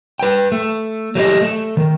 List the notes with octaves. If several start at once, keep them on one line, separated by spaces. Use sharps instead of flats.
B4 G5
A3
F#3 A3 G4 D#5
A3
D#3